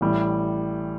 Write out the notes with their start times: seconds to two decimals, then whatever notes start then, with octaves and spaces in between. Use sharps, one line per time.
0.01 A1 A2 G3